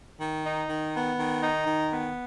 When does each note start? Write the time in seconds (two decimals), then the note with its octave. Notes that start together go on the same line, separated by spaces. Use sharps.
0.19 D#3
0.44 D#4
0.68 D#3
0.93 B3
1.18 D#3
1.42 D#4
1.66 D#3
1.92 B3